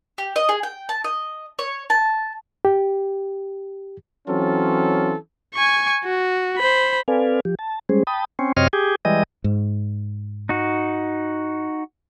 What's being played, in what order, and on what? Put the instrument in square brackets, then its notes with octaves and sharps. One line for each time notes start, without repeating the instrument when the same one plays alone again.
[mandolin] G4
D#5
G#4
G5
A5
D#5
C#5
A5
[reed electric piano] G4
[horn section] E3 F#3 C4 C#4 F4 A4
[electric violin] G#5 C#6
F#4
C5 B5
[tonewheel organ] C4 A4 B4 D5 F5 G#5
F3 G4
A5
G3 G#3 C#4 G#4 C5
G5 A5 B5 D#6
C4 C#4
F#2 C3 C4 C#5 D#5 F6
G4 G#4
E3 G3 G#3 D#5
[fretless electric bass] G#2
[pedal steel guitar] D#4 F#4